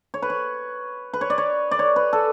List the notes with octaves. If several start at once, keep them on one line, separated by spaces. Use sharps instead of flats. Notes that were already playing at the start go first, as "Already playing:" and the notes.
C#5
B4
C#5
B4
C#5
D5
C#5
D5
C#5
B4
A4